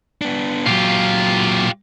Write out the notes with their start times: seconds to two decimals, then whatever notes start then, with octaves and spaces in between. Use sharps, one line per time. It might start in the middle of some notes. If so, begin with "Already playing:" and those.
0.22 B3 D4
0.66 A#2 F#3 F4 G4